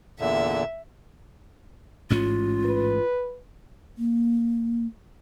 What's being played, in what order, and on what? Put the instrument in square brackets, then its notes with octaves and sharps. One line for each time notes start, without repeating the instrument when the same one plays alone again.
[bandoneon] E2 A#2 D3 [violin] E5
[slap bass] A1 G#2 C#4 [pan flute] F4
[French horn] B4
[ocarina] A#3